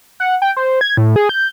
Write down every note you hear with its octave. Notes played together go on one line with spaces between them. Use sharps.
F#5
G5
C5
G#6
A2
G#4
G6